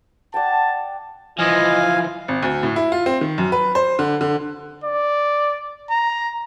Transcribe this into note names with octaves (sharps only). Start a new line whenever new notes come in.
D5 F#5 G5 A5
E3 F3 F4 D#5 F5 G#5
G#1
D2
A2
E4
F4
C4
D#3
F#2
B4
C5
D3
D3
D5
A#5